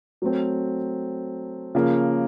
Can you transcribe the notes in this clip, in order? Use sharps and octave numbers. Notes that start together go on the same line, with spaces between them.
F#3 A3 C4
C#3 F3 A#3